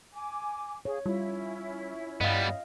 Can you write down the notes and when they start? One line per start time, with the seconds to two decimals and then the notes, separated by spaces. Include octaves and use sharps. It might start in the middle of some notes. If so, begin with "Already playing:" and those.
0.13 G#5 D6
0.85 G#4 C#5 F5
1.06 G3 C#4 E4 F4 C#5
2.21 G2 G3 B3 D#5 F5